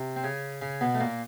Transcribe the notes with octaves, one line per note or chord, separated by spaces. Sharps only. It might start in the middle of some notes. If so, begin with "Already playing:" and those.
Already playing: C3
C4
C#3 C#4
C#3 C#4
B2 B3
A3
A#2 A#3